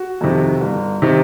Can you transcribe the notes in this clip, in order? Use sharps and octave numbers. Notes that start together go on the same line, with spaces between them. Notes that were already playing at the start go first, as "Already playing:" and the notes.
Already playing: F#4
F2 C3 D#3
G1
C3 D#3